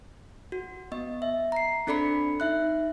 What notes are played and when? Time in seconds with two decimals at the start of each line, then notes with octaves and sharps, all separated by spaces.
0.52 F#4
0.92 B3 D#5
1.22 E5
1.52 A#5 C7
1.87 C4 D4 A4 D5 B5 C#7
2.40 D#4 E5 F#6